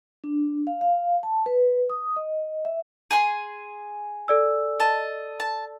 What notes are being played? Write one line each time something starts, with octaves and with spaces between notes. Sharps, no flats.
D4
F5
F5
A5
B4
D#6
D#5
E5
G#4 G#5 C6 D#7
A4 D5 E6
D#5 A5
A5